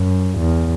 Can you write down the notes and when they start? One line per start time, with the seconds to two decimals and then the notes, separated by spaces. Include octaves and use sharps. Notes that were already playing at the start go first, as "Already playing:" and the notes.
Already playing: F#2
0.39 E2